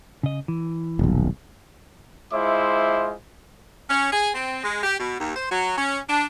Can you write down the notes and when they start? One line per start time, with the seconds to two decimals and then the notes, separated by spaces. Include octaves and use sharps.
0.23 C#3 D#5
0.48 E3
0.99 D#1 B1
2.33 G#3 E4 F4 C5 E5 D6
3.89 C#4
4.12 G#4
4.34 C4
4.64 G#3
4.84 G4
4.98 B2
5.19 D#2
5.36 C5
5.51 F#3
5.77 C#4
6.09 D4